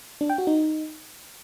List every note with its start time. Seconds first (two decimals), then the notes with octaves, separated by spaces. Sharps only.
0.21 D4
0.30 G5
0.38 F#4
0.47 D#4